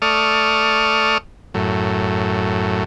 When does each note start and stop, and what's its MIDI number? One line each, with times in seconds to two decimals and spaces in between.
0.02 1.18 57
0.02 1.18 74
0.02 1.18 85
0.02 1.18 87
0.02 1.18 89
1.54 2.84 42
1.54 2.84 45